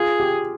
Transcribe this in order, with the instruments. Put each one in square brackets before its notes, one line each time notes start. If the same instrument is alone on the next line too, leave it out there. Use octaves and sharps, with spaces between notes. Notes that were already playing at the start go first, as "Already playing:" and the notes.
Already playing: [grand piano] F4 [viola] G#4
[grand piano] G4